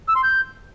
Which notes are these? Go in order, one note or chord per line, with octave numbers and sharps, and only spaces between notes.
E6
C6
G6